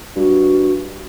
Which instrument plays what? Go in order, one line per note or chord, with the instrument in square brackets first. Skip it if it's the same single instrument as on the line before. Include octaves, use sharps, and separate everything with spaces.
[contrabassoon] G2 [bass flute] F#4